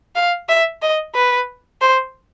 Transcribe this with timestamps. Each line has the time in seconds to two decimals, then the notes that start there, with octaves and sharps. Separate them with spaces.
0.15 F5
0.49 E5
0.82 D#5
1.15 B4
1.82 C5